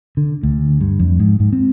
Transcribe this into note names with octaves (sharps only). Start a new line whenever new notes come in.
D3
D2
G2
F2
G#2
G#2
C4